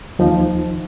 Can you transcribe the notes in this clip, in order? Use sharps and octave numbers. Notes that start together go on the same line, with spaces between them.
D#2 F3 D#4